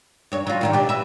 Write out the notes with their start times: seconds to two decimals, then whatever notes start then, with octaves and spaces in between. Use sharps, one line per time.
0.32 G2 C#5
0.47 F#3 F4
0.61 A2 D#3 G3
0.73 B2 D4 G4
0.89 B4 E5